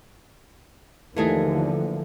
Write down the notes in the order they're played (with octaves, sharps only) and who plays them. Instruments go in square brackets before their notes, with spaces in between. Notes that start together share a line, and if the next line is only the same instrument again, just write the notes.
[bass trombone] D#2 [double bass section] D3 F3 A#3 [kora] E3 A3 G#4